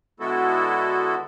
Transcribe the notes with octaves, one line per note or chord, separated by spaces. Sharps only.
D3 G#3 B3 E4 F#4 A4